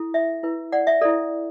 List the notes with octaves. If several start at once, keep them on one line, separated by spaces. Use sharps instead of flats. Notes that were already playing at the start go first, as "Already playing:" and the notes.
Already playing: E4 A4
E5
E4 B4
D5 F#5
E5
E4 A4 D5